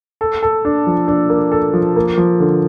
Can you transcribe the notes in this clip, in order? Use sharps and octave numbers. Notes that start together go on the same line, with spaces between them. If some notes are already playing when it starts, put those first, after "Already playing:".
A4
A4
D4
F3
D4
A#3
A4
F3
A#3
F3
D3